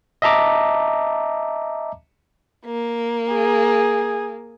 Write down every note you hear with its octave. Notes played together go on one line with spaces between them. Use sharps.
D#5 E5 A5 A#5 D6
A#3
G#4